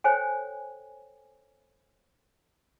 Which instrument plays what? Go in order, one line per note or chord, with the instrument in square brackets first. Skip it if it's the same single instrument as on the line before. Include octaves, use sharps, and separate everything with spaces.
[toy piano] A4 C5 C#5 G5 G#5